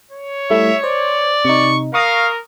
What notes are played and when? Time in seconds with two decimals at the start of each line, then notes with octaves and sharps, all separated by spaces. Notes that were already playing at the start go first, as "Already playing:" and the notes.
0.11 C#5
0.50 G3 A3 E4 E5
0.84 C5 D5
1.45 C3 D#4 C#6
1.94 A#4 F5 C#6 D#6 A#6